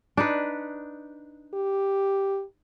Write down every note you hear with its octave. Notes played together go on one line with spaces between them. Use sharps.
D4 D#4 B4
G4